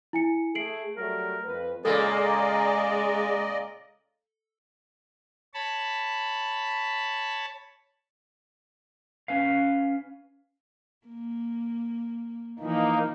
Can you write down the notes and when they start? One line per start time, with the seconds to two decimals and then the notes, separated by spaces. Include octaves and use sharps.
0.13 E4 G#5 C#7
0.55 A3 G#4 C7 D7 F#7
0.97 F#3 G3 A3 A#4
1.45 F2 B4
1.85 A#2 C#3 G#3 A#3 A4 D5 D#5
5.54 C#5 A5 B5
9.28 C#4 B4 F5
11.07 A#3
12.59 E3 F3 A#3 D#4